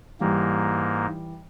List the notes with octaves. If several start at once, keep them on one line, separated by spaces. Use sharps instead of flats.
G#2 E3 G3 A#3